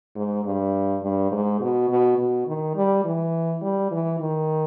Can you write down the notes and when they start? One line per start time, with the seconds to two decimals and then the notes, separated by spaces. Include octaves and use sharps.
0.15 G#2
0.44 G2
1.02 G2
1.32 G#2
1.60 B2
1.89 B2
2.18 B2
2.47 D#3
2.75 G3
3.04 E3
3.62 G3
3.91 E3
4.20 D#3